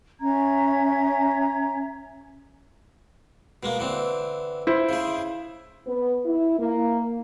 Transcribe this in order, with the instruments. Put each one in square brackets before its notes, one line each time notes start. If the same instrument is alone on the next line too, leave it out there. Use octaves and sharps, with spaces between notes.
[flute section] C#4 E5 A#5 G#6
[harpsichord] B2 G#3 A#3
D3 E3 C4
[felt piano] E4 C5
[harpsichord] C#3 G#4
[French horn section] B3
E4
A#3